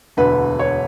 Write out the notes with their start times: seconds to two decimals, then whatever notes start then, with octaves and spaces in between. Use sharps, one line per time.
0.17 E1 D2 D3 B4
0.59 C#5